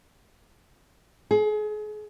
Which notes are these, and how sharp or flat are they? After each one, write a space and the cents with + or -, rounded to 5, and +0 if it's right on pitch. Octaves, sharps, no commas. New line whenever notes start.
G#4 +35